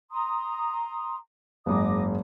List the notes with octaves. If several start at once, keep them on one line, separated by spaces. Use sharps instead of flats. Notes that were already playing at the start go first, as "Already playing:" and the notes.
A#5 C6 D#6
F#1 G#2 G#4 D#5 D6 D#6